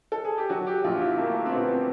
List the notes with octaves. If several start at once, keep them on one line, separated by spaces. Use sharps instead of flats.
A4
G#4
G4
F#3 F#4
G4
A#1 F4
E4
A3 A#3
C4
A#2 B3
C4